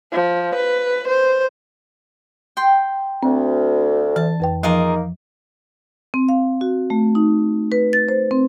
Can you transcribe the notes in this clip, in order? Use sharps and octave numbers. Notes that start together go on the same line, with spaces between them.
F3
B4
C5
G5 C6
D2 C4
E3 A5
F2 B4 G5
F3 A#3 D#4 F4 G#4 A#4
C4
F5
F#4
A3
D#4
B4
A6
C5
C4